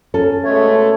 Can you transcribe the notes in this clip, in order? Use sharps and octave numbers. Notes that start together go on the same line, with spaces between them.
C#4 A4
B2 G#3 A3 C#5